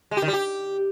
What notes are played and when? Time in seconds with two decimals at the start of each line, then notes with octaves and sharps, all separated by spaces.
0.11 G#3
0.17 G4
0.22 D#3
0.28 G3
0.33 G4